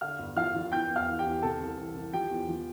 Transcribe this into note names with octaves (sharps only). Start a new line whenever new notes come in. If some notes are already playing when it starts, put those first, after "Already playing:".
D3 F5 F6
G1
F3 F5 F6
F3
E2 G5 G6
E2
F5 F6
E3
G4 G5
E2
C3 A4 A5
C2
E3
C2
F3 G4 G5
E2
F3